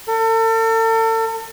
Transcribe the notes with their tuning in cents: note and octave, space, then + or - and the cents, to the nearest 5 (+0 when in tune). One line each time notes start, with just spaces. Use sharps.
A4 +40